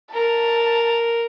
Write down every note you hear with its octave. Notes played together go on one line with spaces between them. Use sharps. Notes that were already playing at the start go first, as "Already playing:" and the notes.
A#4 A5